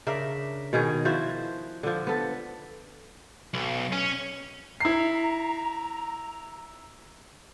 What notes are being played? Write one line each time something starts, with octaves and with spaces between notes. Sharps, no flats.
C#3 D4 A#4 E5
B2 D#3 G#4 C#5
F3 E4 F#4 C5
D3 F3
B3 A4
B1
C#4
E4 A#5 C7